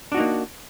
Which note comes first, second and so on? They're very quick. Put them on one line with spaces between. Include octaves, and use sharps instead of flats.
D4 F#4 D#4 A#3